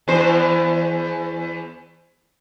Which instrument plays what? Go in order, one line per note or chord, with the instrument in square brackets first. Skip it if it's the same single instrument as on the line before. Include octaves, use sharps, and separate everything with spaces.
[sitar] E2 C5